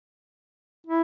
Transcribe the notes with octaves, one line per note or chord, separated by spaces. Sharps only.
E4